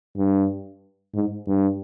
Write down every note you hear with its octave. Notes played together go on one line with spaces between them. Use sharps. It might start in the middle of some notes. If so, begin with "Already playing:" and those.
G2
G#2
G2